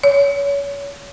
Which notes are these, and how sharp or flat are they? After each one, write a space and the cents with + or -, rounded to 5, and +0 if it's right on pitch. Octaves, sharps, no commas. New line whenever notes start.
C#5 +30